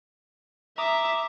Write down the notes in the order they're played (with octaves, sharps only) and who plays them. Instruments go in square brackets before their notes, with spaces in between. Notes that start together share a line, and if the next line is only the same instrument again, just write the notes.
[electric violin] E5 [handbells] A#5 D6 D#6